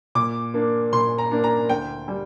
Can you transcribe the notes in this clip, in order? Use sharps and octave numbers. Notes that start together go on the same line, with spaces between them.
A#2 D6
A#3 D4
A#2 C6
A#5
A#3 D4
A#5
D2 G5
G3